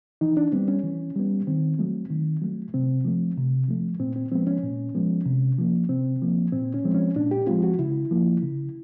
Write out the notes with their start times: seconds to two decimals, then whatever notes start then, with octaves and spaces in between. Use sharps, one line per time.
0.21 E3 D#4
0.37 D4
0.52 G3 B3 C4
0.68 C#4
0.84 E3
1.16 G3 B3
1.47 D#3 C4
1.79 F#3 A3
2.10 D#3
2.42 F#3 A3
2.74 C3 C4
3.05 F3 A3
3.37 C3
3.68 F3 A3
3.99 A#2 C4
4.16 C4
4.31 F3 G#3 B3 C4
4.47 C#4
4.63 A#2
4.95 F3 G#3 B3
5.26 C3
5.58 F3 A#3
5.89 C3 C4
6.22 F3 A#3
6.52 A#2 C4
6.74 C#4
6.84 F3 G#3 C4
6.94 C#4
7.15 A#2 D4
7.31 G4
7.47 F3 G#3 C4 F4
7.64 F#4
7.79 C#3 E4
8.11 F3 A#3
8.43 C#3